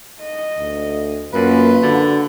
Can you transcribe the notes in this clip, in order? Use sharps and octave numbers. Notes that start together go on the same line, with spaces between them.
D#5
D2
F#2 A#3 F4 B4
D3 F#4